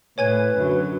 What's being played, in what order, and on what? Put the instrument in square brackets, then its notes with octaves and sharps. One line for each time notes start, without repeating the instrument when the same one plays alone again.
[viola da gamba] A2 [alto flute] B4 [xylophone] C#5 G#5 G#6
[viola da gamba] F#2 D3 F#3